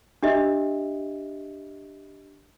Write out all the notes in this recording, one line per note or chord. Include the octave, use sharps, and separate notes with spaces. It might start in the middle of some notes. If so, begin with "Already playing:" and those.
D4 G4 D#5 E5